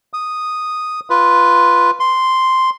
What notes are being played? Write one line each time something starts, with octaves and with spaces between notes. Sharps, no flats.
D#6
F4 B4
C6